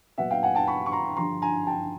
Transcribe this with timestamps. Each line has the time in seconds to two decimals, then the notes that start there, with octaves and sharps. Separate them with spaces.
0.18 A#2 F#3 B3 E5 F#5
0.30 F5 G5
0.43 F#5 G#5
0.55 G5 A5
0.67 B5 C#6
0.86 C#6
0.92 A#5 C6
1.17 G2 D3 F3 A#5 C6
1.42 G#5 A#5
1.67 G5 A5